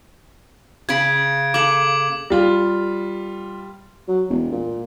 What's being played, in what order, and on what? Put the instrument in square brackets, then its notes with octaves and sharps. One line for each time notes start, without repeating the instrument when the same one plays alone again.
[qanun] C#3 B5 [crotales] G#6 D7
[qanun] A#3 A4 [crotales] D6 F#7
[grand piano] G3 F4
[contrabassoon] F#3
E1
A#2